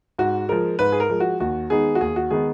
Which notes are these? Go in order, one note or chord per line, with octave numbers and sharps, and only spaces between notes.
G#2 F#4
F3 G#3 A#4
G#2 B4
G#4
A#4
F3 G#3
F#4
D#2 F#4
D#3 G#3 B3 D#4 G#4
F#4
D#2 G#4
F#4
D#3 G#3 B3 D#4 G#4